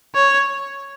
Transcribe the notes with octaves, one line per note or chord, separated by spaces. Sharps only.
C#5